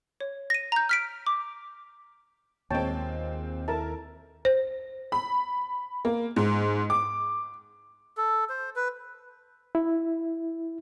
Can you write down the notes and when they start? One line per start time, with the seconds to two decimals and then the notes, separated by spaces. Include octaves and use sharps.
0.21 C#5
0.50 A#6 D#7
0.72 A#5 G6
0.89 F6 B6 D7
1.27 D6
2.71 D#2 A#2 G#3 C4 C#5 G5 A5
3.68 E4 A4 A#4 A5
4.45 C5
5.12 B5
6.05 A#3
6.36 G#2
6.90 D6
8.17 A4
8.49 C5
8.76 B4
9.75 E4